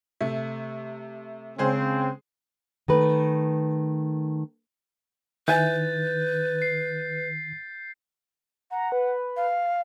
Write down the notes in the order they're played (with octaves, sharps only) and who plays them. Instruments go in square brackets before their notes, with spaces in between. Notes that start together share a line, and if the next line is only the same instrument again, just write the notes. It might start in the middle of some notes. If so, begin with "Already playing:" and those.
[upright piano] C3 A3
[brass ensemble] C#3 C4 [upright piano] G#3 G#4 C5
[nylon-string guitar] D#3 A3 B4
[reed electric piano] D#3 [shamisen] E4 E5 G#5 [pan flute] B4 [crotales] G6 A6
[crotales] C7
[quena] F#5 [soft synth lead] A#5
[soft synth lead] B4
[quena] F5